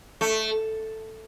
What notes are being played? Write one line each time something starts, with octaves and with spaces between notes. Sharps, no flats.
A3